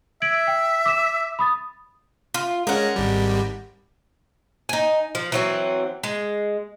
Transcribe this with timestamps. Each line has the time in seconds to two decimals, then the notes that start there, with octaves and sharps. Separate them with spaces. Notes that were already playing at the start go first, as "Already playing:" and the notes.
0.22 E5 G#6 D7 F#7
0.47 G5
0.86 D6 E7
1.39 B5 D#6 A6
2.34 F4
2.67 G#3 C#4 A#4 F#5
2.96 G#1 G3
4.69 D#4 G#5
5.15 F3
5.32 E3 F#3 C4
6.03 G#3